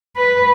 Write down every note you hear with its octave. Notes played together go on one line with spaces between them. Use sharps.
B4